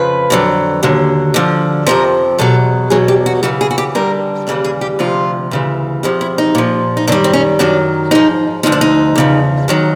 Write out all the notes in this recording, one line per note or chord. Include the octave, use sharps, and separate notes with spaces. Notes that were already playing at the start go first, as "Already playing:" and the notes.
Already playing: F2 C#3 F3 B4
F2 D3 F#3
D#2 D3 F#3
D2 D3 F3
F2 C3 F3 A#4
E2 B2 F#3 A4
E2 B2 F#3 G#4
G4
F#4
F#2 C#3 E3 F#4
G#4
F#4
G4
G2 D3 G3 A#4
D#2 C#3 E3 G3 A4
G#4
G4
D2 C3 F3 F4
D2 C#3 E3
E2 C3 F3 E4
E4
D#4
A#2 F3
D#4
F#2 D#3 G3 D4
C4
C#4
F#2 D#3 F#3 D4
G#2 F3 D#4
D2 D3 F3 D#4
D4
D#4
E2 C#3 F3
G#2 D#3 F#3